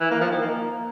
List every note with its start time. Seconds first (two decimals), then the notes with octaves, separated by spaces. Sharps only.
0.01 E3
0.11 A#3
0.21 F3
0.31 D#3
0.42 A#3